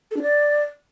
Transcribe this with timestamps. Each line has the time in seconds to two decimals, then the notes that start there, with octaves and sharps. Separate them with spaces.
0.11 A4
0.17 D4
0.22 D5